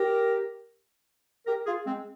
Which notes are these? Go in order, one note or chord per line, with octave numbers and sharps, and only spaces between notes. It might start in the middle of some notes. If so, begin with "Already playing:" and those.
Already playing: G4 A#4
G4 A#4
F4 G#4
G#3 C4